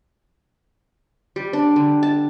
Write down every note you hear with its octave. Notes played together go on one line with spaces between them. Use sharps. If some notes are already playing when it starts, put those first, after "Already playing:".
G3
D4
D3
A5